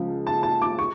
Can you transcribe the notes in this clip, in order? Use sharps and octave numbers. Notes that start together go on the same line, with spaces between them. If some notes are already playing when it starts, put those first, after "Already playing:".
Already playing: C#2 C#3 F3
A5
A5
D6
C#6